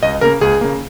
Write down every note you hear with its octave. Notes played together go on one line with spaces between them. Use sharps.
C#2 D#5
C#3 A#3 A#4
C#2 G#4
C#3 A#3